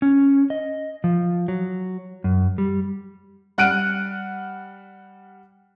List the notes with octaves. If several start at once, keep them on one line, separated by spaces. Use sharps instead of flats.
C#4
D#5
F3
F#3
F#2
G3
G3 F#5 F6 F#6 D7 D#7